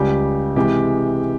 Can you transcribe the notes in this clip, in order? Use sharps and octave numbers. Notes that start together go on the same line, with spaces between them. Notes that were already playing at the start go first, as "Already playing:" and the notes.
Already playing: C#2 C#3 G3 G4
C3 E3 G#3 G4